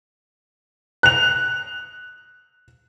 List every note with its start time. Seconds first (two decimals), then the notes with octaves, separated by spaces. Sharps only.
1.03 F#6 F7